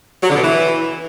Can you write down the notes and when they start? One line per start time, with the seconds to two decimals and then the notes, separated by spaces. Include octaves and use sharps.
0.23 F#3
0.30 D3
0.36 B2
0.43 E3